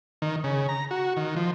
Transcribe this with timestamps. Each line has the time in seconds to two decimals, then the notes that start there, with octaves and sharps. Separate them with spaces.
0.22 D#3
0.44 C#3
0.69 A#5
0.91 F#4
1.17 D#3
1.36 F3